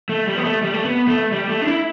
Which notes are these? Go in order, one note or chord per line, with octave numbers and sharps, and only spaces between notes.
A3
G3
B3
A3
G3
A3
B3
A3
G3
A3
D4
E4